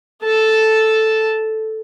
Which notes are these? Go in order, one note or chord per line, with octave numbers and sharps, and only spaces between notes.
A4 A5